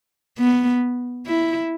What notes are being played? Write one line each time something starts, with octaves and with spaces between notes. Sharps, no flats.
B3
E4